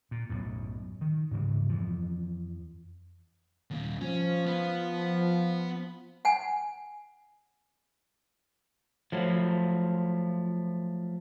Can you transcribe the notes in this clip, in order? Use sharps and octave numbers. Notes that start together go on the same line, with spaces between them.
A#2
B1 F#2 A2
D#3
G#2 C#3 E3 G#3
F2 E3 F3
D#2 A#2
F3 C#4
B3
F#5 G#5
F3 F#3 A3